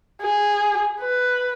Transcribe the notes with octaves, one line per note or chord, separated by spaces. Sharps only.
G#4
B4